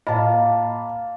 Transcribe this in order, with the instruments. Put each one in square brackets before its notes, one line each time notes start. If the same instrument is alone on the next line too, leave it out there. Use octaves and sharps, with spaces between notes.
[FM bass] A2 [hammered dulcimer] A#3 [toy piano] D#5 [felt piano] F5 A5 B5